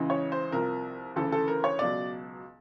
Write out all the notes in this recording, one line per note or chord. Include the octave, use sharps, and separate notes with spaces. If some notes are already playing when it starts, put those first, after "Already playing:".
Already playing: C#2 C#3 E3
C#5
C5
C2 C3 F3 A#4
D2 C#3 E3 A4
A4
A#4
C#5
C#2 B2 F#3 D5